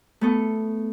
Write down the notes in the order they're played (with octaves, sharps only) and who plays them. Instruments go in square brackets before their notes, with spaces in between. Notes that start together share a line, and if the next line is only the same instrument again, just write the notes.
[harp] A3 B3 A4